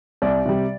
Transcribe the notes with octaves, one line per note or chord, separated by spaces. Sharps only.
C2 D5
C3 G3